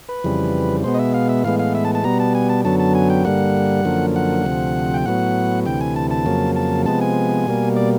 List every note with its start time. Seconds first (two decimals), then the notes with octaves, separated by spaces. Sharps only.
0.09 B4
0.24 F2 C#3 E3 G3
0.84 B2 G#3 B3 C5
0.94 D#5
0.99 E5
1.14 F5
1.29 E5
1.44 A2 E3 G#3 B3 F5
1.59 F5
1.75 E5
1.85 A5
1.95 A5
2.04 B2 G3 B3 A#5
2.20 A5
2.35 G#5
2.49 A5
2.65 F#2 D3 F#3 B3 A5
2.80 A5
2.95 G#5
3.10 G5
3.25 G2 D3 G3 A#3 F#5
3.85 F#2 D3 F3 A#3
4.16 F#5
4.45 D2 C3 F3
4.94 G5
5.06 A2 F#3 B3 F#5
5.66 D2 C3 E3 G5
5.81 G#5
5.96 A5
6.11 A5
6.26 F2 C#3 F#3 A#3
6.56 A5
6.86 C3 F3 G#3 B3 A5
7.01 G#5
7.47 B2 G3 A#3
7.76 D5